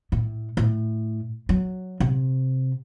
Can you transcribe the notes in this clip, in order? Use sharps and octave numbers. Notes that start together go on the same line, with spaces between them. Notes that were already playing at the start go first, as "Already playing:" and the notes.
A2
A2
F#3
C3